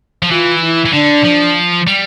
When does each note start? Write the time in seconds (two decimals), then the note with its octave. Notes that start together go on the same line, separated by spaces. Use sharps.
0.22 F3
0.31 E3 F4
0.63 E4
0.85 E3
0.93 D3 D4
1.24 F3
1.87 G3